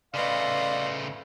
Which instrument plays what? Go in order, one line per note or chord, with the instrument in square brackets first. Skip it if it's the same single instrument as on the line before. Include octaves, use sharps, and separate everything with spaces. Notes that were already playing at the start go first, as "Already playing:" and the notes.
[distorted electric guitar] C#3 A3 [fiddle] B4 D#5 [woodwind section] D5 F5 C6